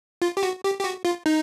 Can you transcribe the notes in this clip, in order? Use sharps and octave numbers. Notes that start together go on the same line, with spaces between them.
F4
G4
F#4
G4
G4
F#4
F4
D#4